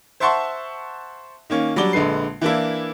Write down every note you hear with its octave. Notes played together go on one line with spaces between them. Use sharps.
C5 E5 F#5 A5 C6 C#6
D#3 A#3 C#4
F#3 G3 D4 D5 G7
A#1 D3 G#3 B4 C7
E3 A#3 D4 E4